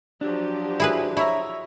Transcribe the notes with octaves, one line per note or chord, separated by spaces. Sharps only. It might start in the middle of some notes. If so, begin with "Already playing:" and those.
F3 F#3 D4 G4
E4 G#4 B4
E4 C#5 E5 A#5